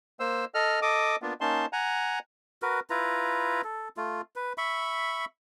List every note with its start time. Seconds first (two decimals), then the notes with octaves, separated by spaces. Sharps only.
0.20 A#3 C5 E6
0.55 A4 D#5 F6
0.82 A4 D#5 D6 D#6
1.22 A#3 B3 D4 F4
1.41 A#3 C#4 D#4 A5 C6
1.73 F#5 G#5 A#5
2.62 F#4 A#4 B4
2.90 E4 F4 B4 A#5
3.64 A4
3.97 A3 F4
4.36 B4
4.58 E5 B5 C#6